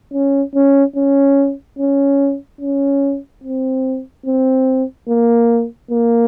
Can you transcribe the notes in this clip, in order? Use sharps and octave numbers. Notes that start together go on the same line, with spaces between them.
C#4
C#4
C#4
C#4
C#4
C4
C4
A#3
A#3